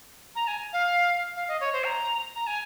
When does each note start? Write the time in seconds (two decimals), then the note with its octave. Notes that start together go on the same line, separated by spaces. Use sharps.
0.35 A#5
0.48 G#5
0.73 F5
1.36 F5
1.48 D#5
1.61 C#5
1.73 C5
1.85 A#5
2.36 A#5
2.47 G#5